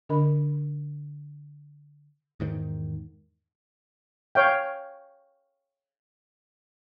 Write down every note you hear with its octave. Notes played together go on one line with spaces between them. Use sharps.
D3 D4 A#4 D#5 B5
E2 G#2 D#3
C#5 F5 G5